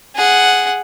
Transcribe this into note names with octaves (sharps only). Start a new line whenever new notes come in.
G#4 F#5